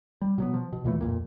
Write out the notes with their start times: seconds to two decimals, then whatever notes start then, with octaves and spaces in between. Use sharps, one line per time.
0.22 G3
0.38 B2 F#3 B3
0.54 F3
0.72 B2
0.84 D#2 A#2 E3 A3
1.01 D1 F2 A#2